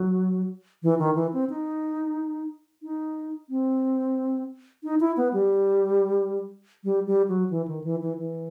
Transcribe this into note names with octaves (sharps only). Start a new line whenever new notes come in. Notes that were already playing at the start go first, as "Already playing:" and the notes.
Already playing: F#3
E3
D#3
E3
C4
D#4
D#4
C4
D#4
E4
B3
G3
G3
G3
F#3
E3
D#3
E3
E3
E3